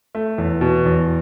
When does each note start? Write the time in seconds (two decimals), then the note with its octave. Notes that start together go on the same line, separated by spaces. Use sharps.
0.15 A3
0.38 E2
0.61 B2
0.85 E2